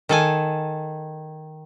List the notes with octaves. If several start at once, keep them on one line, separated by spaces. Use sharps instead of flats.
D#3 A4 G#5